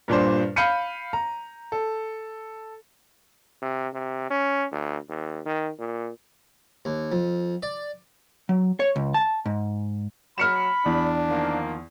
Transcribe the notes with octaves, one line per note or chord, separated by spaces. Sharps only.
G2 A#2 D4 C5
F5 B5 G6 C#7 D#7
A#5
A4
C3
C3
C#4
D2
D#2
D#3
A#2
D#2
F2
D5
F#3
C#5
C#2
A5
G#2
F#3 B5 F6 C#7 E7
E2 D4
D#3 F3 A#3